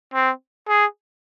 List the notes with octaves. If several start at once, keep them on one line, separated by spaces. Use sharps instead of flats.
C4
G#4